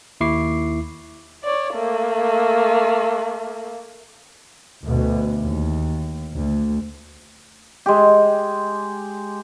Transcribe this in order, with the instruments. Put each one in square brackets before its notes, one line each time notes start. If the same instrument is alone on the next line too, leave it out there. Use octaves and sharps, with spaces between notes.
[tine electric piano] D#2 E4 C#6 D6 C7
[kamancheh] C#5 D5
A3 A#3
[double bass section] D2 B2
D#2
D2
[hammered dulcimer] G#3 G4